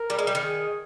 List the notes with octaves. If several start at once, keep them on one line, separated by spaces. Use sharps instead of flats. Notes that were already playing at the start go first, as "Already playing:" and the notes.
Already playing: A#4
G3
G#3
G3
D#3
G#4